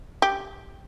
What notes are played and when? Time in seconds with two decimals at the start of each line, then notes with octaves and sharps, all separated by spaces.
0.22 G4